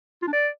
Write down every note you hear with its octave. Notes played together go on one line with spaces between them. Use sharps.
F4
D4
D5